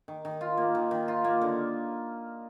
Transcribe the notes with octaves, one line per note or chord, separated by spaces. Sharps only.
D#3
D#3
F4
A#3
D#3
D#3
F4
A#3
D3